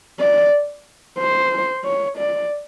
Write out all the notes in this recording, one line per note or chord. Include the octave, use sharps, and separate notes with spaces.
D5
C5
C#5
D5